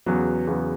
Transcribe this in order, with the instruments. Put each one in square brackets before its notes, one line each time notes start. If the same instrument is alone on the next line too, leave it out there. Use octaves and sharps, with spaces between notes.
[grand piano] E2 C#3 F#3 B3
E2 C#3 F#3 B3